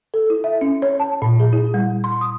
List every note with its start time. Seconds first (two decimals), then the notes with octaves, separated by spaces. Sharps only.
0.14 A4
0.30 E4
0.44 E5
0.61 C#4
0.82 C#5
1.00 A5
1.22 A#2
1.40 G#4
1.53 E4
1.74 G3
2.04 C6
2.21 D#6